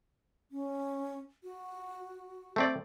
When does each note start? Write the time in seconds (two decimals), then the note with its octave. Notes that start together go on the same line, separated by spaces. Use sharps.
0.51 C#4
1.44 F#4
2.56 A3 C4 D5